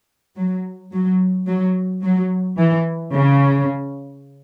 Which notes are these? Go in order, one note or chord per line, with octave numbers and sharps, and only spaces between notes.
F#3
F#3
F#3
F#3
E3
C#3